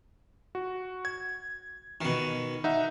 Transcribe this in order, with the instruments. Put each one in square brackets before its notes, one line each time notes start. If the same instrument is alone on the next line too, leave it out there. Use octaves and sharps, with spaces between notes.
[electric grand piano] F#4
G#6
[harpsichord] B2 D#3
[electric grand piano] D#4 E5 F#5